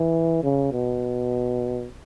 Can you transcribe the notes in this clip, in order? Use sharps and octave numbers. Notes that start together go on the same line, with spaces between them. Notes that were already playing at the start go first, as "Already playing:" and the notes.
Already playing: E3
C#3
B2